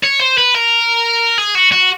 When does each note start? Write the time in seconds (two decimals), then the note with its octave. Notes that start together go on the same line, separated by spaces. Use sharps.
0.04 C#5
0.21 C5
0.38 B4
0.54 A#4
1.38 G#4
1.55 F#4
1.72 F#4